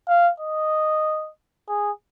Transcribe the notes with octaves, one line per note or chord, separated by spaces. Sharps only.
F5
D#5
G#4